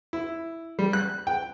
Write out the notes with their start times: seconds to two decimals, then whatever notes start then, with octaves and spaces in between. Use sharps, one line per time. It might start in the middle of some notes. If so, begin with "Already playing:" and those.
0.13 E4
0.79 G3
0.93 F#6
1.27 G5